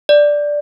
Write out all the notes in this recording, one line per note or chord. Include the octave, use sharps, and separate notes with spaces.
D5